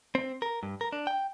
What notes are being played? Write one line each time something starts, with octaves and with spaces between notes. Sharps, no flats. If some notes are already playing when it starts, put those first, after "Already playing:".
C4
A#4
G2
A#4
D4
G5